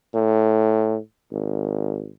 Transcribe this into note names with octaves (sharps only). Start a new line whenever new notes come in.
A2
G#1